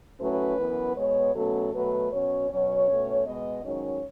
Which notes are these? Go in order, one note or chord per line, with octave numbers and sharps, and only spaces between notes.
A2 F#3 A3 C#4 B4
F#2 E3 B3
B2 G#3 B3 C#5
B2 F#3 A3 C#4 A4
B2 F#3 A3 B4
B2 F#3 C#4 C#5
B2 F#3 C#4 C#5
B2 A3 C#4
B2 G#3 B3 D#5
G#2 D#3 F#3 C#4 C#5